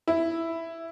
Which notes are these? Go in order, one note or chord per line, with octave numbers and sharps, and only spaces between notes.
E4